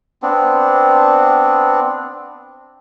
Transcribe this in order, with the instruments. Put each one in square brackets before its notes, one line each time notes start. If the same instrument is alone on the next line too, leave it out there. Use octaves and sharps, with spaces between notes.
[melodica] B3 C4 D4